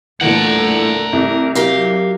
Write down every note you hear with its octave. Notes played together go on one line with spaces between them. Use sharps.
A#2 D3 E3 A3 A#4 F#5
C2
F#3 G4 A#4 F5